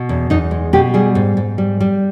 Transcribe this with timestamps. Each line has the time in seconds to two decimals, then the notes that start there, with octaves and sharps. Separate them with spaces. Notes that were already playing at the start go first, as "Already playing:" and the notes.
Already playing: B2
0.09 E2
0.30 E2 D#4
0.51 G#3
0.73 B2 G4
0.94 G3 G#4
1.15 G#2
1.37 G#2
1.58 G3
1.80 G3